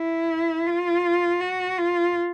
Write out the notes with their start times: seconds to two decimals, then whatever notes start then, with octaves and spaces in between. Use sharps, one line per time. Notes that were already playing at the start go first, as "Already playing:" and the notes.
Already playing: E4
0.67 F4
1.40 F#4
1.78 F4